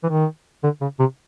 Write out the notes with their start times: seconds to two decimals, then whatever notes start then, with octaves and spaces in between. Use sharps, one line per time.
0.04 E3
0.09 D#3
0.63 D3
0.81 C#3
1.00 C3